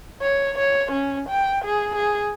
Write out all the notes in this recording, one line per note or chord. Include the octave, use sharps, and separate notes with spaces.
C#5
C#5
C#4
G5
G#4
G#4